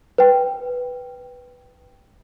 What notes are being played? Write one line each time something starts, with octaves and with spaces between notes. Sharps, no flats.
B4 G5